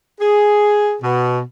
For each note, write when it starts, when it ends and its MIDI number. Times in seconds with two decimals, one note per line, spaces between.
0.19 0.94 68
1.02 1.40 47